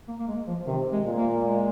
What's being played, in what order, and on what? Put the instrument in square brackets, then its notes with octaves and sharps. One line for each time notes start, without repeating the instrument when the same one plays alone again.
[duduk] A#3
A#3
G#3
F3
[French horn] C3 [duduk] D#3
[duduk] G#3
[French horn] A#2
[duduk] A#3
G#3